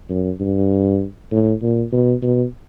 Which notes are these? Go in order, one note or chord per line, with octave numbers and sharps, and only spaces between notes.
F#2
G2
A2
A#2
B2
B2